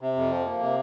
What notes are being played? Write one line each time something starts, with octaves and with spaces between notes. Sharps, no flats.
C3
F2
F3
A#3
C3